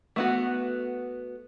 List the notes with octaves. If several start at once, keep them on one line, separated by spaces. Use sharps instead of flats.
A3 B3 F#4